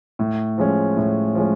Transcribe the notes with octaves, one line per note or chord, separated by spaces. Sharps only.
A2
F3 G#3 C#4
A2
F3 G#3 C#4